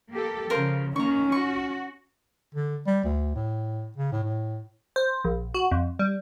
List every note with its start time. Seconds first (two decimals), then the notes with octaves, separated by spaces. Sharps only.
0.11 A#3 G4 A4
0.50 C#3 F3 A#4 C5 F5
0.96 D#3 A#3 C#4 A#5 C#6
1.32 F#4 C#6
2.54 D3
2.86 G3
3.04 D2
3.35 A2
3.96 C#3
4.12 A2
4.23 A2
4.96 C5
5.24 A#1
5.54 F#4
5.71 F2
5.99 G3